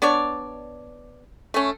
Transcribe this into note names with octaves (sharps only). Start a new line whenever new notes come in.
B3 D4 C#5 D5
A3 C#4